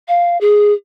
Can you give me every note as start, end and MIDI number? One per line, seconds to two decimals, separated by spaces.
0.08 0.39 77
0.41 0.73 68